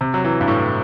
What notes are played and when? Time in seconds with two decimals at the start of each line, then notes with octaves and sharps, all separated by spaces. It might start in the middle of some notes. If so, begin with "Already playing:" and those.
0.01 C3
0.14 F#3
0.25 E3
0.41 G2
0.47 A2